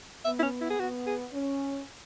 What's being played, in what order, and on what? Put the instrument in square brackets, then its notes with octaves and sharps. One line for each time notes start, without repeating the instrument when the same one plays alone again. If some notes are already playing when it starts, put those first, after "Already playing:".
[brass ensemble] B3 [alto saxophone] E5
[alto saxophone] E4
C#4
E4
G#4
[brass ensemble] B3 [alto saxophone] F#4
[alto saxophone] G#4
[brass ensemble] C#4